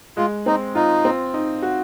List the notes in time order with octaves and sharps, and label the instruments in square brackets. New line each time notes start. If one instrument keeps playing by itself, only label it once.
[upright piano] G#3 [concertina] F4
[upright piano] C4 [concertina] D#4
[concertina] D#4 [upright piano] F4
[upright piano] C4
D#4
F#4